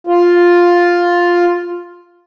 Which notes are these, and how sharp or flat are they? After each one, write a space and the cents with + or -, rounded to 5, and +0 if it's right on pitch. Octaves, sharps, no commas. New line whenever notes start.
F4 +5